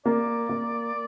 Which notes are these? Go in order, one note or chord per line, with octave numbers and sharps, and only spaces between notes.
A#3 D5
A#3